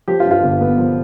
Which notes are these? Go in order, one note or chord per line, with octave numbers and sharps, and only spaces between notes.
F3 G4
F4
G2
F4
G1
B3
F3